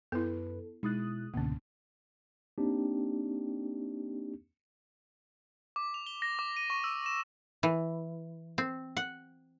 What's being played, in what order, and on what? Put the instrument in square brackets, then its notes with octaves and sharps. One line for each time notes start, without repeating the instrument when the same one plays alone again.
[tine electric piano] F#2 B4 [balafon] B3 E4 [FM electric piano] A4
[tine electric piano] B2 E4 A6 [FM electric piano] G#3 D#6 F#6 [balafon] D#4
[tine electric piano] C#2 G#2 [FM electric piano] B2 D3 [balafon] A#3 C#4
[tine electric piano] A#3 C4 D4 D#4 G4
[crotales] D6
F7
G7
A#6
D6
D#7
C#6
E6
E7
[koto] E3
C4
F#5